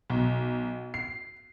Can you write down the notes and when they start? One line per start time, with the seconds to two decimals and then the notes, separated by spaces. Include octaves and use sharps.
0.10 B1
0.94 C7